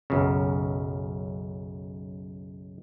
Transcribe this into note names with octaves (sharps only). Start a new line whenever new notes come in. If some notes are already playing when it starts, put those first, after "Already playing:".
B1 F#2 C#3